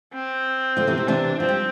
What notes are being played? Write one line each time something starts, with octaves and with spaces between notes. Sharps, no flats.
C4
D3 F3
C3 E3
C3
C3 E3 D4
F3 C4
G3